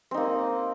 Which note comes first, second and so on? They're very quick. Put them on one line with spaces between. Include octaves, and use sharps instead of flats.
C4 D#4 A#3